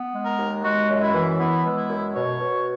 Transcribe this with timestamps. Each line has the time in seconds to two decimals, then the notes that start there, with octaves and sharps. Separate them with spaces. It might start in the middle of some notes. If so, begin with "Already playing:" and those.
Already playing: B3
0.13 G#3
0.25 A#4
0.38 D#2
0.63 G#3 F#4
0.89 F#2
1.01 E4
1.14 E3
1.40 B3 E4
1.64 G#3
1.77 E4
1.90 F#2
2.15 B2 C#5
2.40 B2